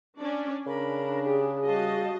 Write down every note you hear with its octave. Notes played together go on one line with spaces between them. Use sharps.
C#4 D4 D5
C#3 D4 A#4 B5
G4 G#4
G3 F#4 D#5 F5 A5